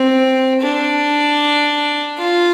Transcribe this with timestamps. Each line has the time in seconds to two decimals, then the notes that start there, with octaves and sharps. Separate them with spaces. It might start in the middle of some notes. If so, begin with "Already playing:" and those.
Already playing: C4
0.61 D4
2.19 F4